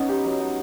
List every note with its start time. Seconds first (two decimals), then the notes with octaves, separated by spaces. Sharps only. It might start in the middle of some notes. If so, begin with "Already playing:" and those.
Already playing: B3 C#4 D#4
0.09 G4
0.24 F#3
0.40 D#4